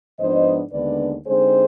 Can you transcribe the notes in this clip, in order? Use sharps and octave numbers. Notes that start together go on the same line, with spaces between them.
G#2 F3 B3 D4 C5 D#5
D#2 D3 G#3 B3 D4 B4 D5
D3 G#3 C4 D#4 G#4 C5